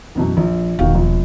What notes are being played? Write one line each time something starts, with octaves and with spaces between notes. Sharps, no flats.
A1 F#2 B2
A#1
E1 D#3 F#4 F5
A#1